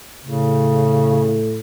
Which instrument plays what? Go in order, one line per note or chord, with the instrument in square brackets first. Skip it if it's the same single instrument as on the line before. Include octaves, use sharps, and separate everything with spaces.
[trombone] A2 [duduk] C#3